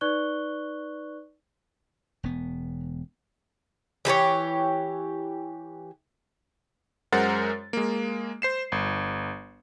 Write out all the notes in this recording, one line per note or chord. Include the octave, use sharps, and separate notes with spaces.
D#4 B4 D5 C#6 F#6 G7
E1 B3
E3 G4 B4 C#5
F#2 G#3 A#4 C5 F#5 A6
G#3 A#3
C5 C7 E7
G1